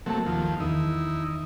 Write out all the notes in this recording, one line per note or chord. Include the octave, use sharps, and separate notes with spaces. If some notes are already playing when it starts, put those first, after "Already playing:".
C3 F#3 A3 A#3 A5
D#2 F3
E2 D#3 D#4 E4